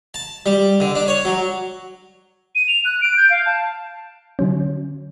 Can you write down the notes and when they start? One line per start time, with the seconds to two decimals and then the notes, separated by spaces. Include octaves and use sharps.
0.14 A5
0.46 G3
0.80 D3
0.95 D4
1.08 C#5
1.25 F#3
2.55 D#7
2.68 F7
2.85 F#6
3.01 D7
3.17 G6
3.30 F5
3.46 A5
4.39 D3 F#3 C#4